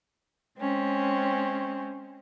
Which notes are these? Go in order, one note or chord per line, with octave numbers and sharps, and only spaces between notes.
G#3 C4 C#4